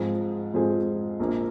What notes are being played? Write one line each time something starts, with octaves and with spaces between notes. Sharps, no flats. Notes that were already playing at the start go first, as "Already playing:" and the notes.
Already playing: G#2 F3 C4 F4 G#4
G#2 F3 C4 F4 G#4
A#1 A#2 F3 A#3